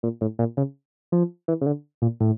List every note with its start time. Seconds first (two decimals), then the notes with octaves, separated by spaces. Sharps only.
0.03 A#2
0.21 A2
0.39 A#2
0.57 C#3
1.12 F3
1.48 E3
1.61 C#3
1.66 D3
2.02 A#2
2.20 A2